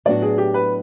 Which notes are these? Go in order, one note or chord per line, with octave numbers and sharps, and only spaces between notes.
A2 F#3 B3 D4 F#4 D5
G#4
G4
B4